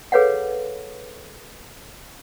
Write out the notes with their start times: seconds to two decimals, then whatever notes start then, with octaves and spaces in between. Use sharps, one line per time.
0.12 G#4 A4 B4 C#5 F5 F#5